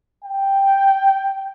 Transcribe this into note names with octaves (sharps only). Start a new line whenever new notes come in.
G5